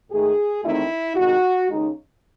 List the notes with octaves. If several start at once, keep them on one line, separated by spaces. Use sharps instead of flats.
G#2 D#3 A3 G#4
E2 D#3 A3 C4 D#4 E4
C3 D#3 G#3 F#4
D#2 C#3 G#3 D#4